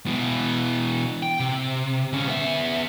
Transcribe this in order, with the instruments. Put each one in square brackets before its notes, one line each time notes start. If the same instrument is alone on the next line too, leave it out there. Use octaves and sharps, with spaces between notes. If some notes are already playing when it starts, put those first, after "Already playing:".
[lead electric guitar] B2 E3
G5
C3
D3 C#4
B3 E5